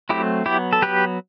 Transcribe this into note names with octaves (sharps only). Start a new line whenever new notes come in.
F#3 A3 C4 E4 G4
F#3 B3 E4 G4
A4
F#3 B3 G4 B4